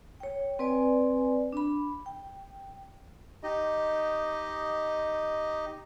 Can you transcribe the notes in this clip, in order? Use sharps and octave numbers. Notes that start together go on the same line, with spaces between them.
C#5 G5
C4 B4 D5 G#5
D4 B5
G5
D#4 G4 D#5